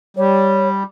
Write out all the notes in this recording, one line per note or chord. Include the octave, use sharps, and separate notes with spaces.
G3 C#5